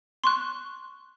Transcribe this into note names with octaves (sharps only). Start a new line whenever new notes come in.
C6 C#6 F#6